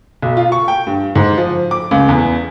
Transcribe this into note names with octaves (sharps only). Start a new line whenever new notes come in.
B1
F4
C#6
G5
G2
G#2
F3
D6
C#2
E2